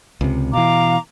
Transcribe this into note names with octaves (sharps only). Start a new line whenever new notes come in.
C#2 C3
B2 E3 F5 A#5 D6